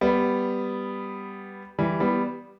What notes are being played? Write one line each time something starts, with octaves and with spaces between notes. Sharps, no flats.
G3 B3
E3 G3
G3 B3